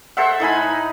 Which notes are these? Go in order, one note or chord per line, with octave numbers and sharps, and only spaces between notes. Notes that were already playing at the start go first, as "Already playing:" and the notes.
A4 C5 E5 F#5
A2 D#4 G#5 B5